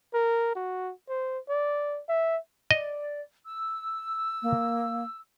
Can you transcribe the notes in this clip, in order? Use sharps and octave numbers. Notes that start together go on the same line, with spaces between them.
A#4
F#4
C5
D5
E5
D5 D#5
E6
A#3